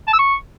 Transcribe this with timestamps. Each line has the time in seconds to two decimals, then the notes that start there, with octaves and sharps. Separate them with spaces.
0.07 A5
0.13 E6
0.19 C#6